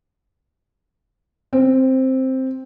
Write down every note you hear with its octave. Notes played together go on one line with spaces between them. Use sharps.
C4